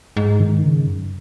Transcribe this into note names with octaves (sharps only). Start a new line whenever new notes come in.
G#2
D#3
C#3
F#2